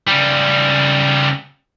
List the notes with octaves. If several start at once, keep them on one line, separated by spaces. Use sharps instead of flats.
C#3 G3